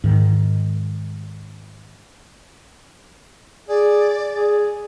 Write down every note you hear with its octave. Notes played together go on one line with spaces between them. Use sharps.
G#2 D#3
G#4 D5
G#4